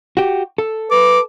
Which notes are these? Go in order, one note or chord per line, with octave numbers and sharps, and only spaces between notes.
F#4 G4
A4
B4 D6